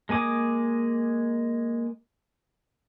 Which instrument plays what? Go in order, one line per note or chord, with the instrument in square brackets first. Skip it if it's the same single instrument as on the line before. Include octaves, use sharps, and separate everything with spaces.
[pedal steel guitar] G#3 A#3 G#5 D6 D#6